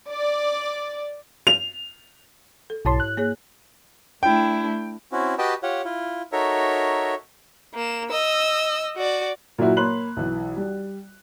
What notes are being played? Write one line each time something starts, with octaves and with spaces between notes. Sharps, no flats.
D5
F7
A4
B1 G#2 E4 C#5 A5 C6
F#6
A#3 G#4 C#5
A3 D4 E4 G5
C4 C#4 E4 F#4
F#4 G4 B4 D#5 G5 A5
F4 G4 C#5 F#5
E4 F4
D#4 F#4 A4 A#4 C#5 E5
A#3 E7
D#5 E6
F#4 D5
A#2 F#3 A#3 E4 F#4
A#3 C#5 B5 C6 F#6 F#7
B1 E3
G3